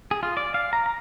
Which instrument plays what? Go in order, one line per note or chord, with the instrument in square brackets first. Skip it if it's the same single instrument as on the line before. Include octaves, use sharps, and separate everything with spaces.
[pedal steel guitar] G#4
F4
D5
F5
A#5
A#5